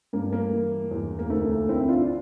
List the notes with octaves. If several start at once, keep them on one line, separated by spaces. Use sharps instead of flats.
G2 A#3
A#3
E3
E2
A#3
D2 A3
A#3
D3 C4 E4
D4 F4